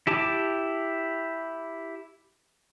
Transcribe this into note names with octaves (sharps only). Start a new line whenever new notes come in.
E4 G4 A5 D6